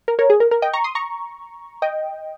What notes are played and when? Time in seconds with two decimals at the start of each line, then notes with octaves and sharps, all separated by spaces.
0.08 A#4
0.19 A#4 C#5
0.30 G#4
0.40 A#4
0.51 A#4
0.62 D#5 G5
0.73 A#5 C#6
0.84 C6 D#6
0.95 A#5 C#6
1.82 D#5 G5